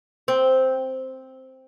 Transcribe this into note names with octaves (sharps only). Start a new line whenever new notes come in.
C4